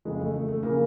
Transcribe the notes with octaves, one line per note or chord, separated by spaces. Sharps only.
F2 C#3 E3 G#3
A3
A3
A3
C#3 E3 A#3